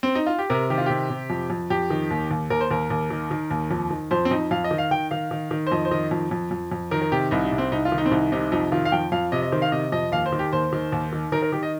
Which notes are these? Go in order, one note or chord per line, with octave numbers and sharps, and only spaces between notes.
C4
D#4
F4
G4
C3 A#4
D#3 G4
F4
C3 G4
C3
F2
F2
F2 G4
D#3
D#2
D#2
D#2 A#4
C5
D#2 A#4
D#2
D#3
D#3
D#2
F2
D#3
F2 C5
C4
F2 D#4
F2 F5
D#5
D#3
F5
D#3 G5
D#3 F5
D#3
D#3
C5
F2 D#5
C5
D#3 D#5
F2
F2
F2
F2
D#3 A#4
A#4
C3 G4
C2 D#4
D#4
C2
C4
C2 D#4
F4
D#3
D#4
C4
C2 D#4
C3 D#4
F2 D#4
D#3 F4
F5
F2 G5
F2 F5
C3 D#5
D#5
D#3 C5
F5
C3 D#5
F2 D#5
D#2 F5
C5
D#3
G4
D#2 C5
D#3
D#2
D#3
D#3 A#4
A#4
D#3 G4
D#5